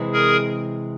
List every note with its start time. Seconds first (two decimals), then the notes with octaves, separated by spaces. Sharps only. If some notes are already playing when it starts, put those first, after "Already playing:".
Already playing: C3 E3 G#3 C4
0.13 G#4 A#4